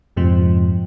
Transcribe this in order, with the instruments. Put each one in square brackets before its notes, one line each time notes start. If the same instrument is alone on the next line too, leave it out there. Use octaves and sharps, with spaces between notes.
[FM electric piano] F2 G#2 C3 F3